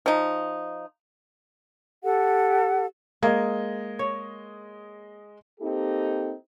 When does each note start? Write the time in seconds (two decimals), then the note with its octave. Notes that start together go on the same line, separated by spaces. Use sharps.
0.06 F3 D#4
2.03 G4 A4 F#5
3.22 G#3 A#3 D#5 G#6
3.99 C#5
5.60 A#3 C4 D#4 G4 A4